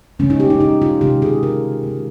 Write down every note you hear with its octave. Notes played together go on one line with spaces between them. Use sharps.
C#3 G#3 C#4
D#4
G4
D#4
D#4
F4
C3 D#3 G#3 G4
G#4
A#4
D#3 G#3